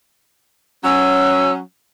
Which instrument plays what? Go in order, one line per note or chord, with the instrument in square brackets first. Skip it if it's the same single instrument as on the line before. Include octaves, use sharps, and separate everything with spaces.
[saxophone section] F#3 C#4 [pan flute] E6